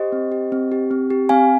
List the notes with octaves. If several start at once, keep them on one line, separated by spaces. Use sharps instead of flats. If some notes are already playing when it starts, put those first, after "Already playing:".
Already playing: G4 C5 D#5
C4
G4
C4
G4
C4
G4
C4 F5 G#5